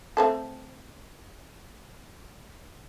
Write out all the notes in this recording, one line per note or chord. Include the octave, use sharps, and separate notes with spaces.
A3 C4 A4